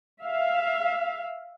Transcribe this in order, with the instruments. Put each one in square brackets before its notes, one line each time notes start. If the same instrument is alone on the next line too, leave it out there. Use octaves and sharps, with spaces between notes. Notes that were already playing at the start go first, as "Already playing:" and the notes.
[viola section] E5 F5